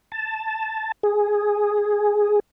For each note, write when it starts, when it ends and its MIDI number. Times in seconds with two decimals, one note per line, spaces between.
0.12 0.92 81
1.03 2.40 68